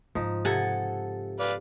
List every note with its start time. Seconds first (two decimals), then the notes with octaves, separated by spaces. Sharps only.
0.15 G#2 C#3 F3 D#4
0.45 C3 A4 F#5 G#5
1.40 B4 D5 F5